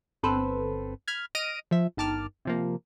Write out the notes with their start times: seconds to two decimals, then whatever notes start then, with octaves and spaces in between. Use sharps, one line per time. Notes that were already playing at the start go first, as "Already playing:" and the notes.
0.23 G1 C4 A4 B4 C5
1.08 B5 F6 G#6
1.35 D#5 F6 A#6 D7 D#7
1.71 F3 E5
1.97 G1 D#3 A5 D6 F6
2.45 C3 F3 A#3